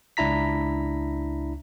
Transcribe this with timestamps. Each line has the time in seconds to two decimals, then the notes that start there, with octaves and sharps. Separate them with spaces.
0.17 C#2 D4 E4 A#5 B6